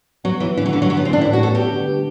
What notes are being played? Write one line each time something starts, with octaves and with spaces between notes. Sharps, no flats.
F#3 B3
E3 E4
D3 E3
F#3
D3 E3
F#3
E3 F#4
B3
E3 C4
D4
A2 E4
F#4
B3
A4
B3 G4
D3
G3